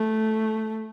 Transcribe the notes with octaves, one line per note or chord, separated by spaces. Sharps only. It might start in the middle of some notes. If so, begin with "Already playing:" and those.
Already playing: A3